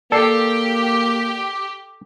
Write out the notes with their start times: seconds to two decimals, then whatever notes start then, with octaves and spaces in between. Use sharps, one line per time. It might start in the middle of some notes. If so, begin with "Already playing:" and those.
0.12 A#3 G4 A4 D5 C7